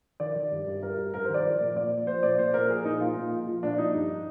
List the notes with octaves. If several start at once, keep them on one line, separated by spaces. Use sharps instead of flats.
D#3 D5
D#3
G2
G2
G2 A#4
G2
G2 A#4
C5
D#3
D5
F3
A#2
A#2 D5
F3
F3 C5
A#2 D5
A#2 C5
A#2 A#4
F3 G#4
A#2 D#4
A#2 F4
A#2
F3
F3
A#2 D4
F3 D#4
G2